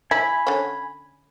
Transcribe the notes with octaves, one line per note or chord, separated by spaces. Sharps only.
E4 G#5 B5
D3 C#4